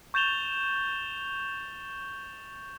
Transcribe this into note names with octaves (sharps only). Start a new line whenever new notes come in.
C#6 G6 A6 E7 F7 G7